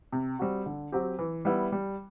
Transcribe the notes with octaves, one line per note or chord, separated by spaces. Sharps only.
C3
G3 C4 F#4
D3
F#3 C4 G4
E3
G3 B3 E4
G3